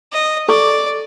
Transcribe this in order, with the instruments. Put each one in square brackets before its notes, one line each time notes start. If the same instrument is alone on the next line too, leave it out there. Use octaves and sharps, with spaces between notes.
[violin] D#5
[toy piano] A4 C#6 D6 [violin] D5